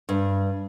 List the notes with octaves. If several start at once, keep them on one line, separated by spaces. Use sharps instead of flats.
G2